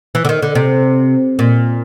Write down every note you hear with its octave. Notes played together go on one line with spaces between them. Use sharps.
E3
D3
D#3
D3
C3
A#2